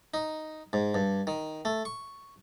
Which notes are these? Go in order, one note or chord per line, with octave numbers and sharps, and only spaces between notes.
D#4
G#2
G2
D#3
A3
C#6